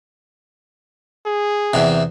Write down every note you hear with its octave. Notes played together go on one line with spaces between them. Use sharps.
G#4
E2 C3